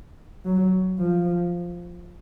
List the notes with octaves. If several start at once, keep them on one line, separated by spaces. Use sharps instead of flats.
F#3
F3